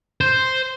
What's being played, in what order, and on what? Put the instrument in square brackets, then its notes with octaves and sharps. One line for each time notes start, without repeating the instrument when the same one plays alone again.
[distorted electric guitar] C5